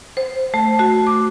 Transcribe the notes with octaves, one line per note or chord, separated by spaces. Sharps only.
C5
A3
A3 F#4
D6